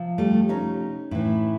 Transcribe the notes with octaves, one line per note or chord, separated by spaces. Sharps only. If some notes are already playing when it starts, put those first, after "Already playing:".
Already playing: C3 F3
G3 A3
C#4 D#4
A2 E3